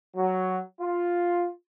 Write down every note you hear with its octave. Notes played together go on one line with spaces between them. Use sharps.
F#3
F4